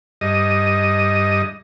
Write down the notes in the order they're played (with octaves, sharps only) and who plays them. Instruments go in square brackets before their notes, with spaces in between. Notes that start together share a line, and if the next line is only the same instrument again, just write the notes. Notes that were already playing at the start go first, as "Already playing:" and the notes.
[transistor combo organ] G2 D#5